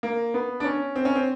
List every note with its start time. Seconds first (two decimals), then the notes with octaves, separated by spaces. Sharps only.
0.03 A#3
0.34 B3
0.60 D4
0.64 C#4
0.96 C4
1.05 C#4
1.15 C4